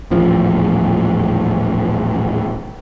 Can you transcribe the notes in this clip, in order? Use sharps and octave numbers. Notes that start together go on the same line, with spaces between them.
D#1 A1 F3